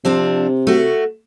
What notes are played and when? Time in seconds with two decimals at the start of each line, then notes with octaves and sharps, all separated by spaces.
0.05 C3 F3 C4 D4
0.67 A3 F#4